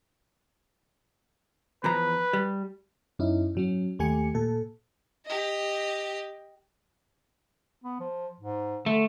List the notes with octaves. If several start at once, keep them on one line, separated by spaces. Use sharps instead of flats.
E2 F3 B4 A#5
G3
F#2 C#4 D#4 E4
G#2 F#3 C#4
D#2 A3 G4 G#5 C#7
A#2 A4
G4 D#5
B3
F3
G#2
D3 A3